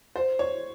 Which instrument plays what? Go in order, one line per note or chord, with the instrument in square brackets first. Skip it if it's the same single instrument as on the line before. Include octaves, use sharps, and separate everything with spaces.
[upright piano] C5
C#5